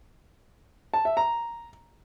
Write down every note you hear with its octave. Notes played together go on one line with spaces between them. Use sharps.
A5
E5
A#5